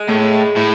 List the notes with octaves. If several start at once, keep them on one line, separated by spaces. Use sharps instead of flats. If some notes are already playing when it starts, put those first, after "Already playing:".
Already playing: G#3
A2
A2